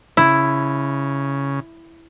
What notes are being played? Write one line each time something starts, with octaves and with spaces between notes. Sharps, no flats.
C#3 E4